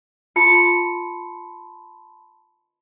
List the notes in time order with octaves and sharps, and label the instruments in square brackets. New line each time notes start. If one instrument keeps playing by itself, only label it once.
[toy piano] F4 [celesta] A5 B5 C6 [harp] C#7